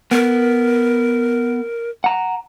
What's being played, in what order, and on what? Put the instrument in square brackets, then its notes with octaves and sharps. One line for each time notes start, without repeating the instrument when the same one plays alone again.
[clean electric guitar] B3 [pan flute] A#4
[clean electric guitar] F#5 A#5